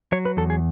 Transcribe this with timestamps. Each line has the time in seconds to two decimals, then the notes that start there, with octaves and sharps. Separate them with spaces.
0.12 F#3 C#5
0.25 B4
0.37 E2 A4
0.50 G#4